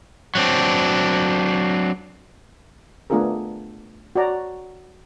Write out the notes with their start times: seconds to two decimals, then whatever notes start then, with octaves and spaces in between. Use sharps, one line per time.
0.35 F#3 C4 D4
3.10 A3 B3 D4 F4 G#4 A#4
4.15 F#4 C#5 D5 A#5